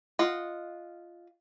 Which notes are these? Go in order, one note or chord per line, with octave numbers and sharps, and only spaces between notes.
F4 D#5 F#5